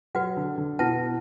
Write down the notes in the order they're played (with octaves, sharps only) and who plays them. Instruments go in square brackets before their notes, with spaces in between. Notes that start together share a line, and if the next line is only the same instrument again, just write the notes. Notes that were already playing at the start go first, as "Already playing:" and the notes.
[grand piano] F#3 [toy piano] F#4 B4 F#5
[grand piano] D3
D3
[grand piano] B2 [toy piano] E4 B4 F#5 A5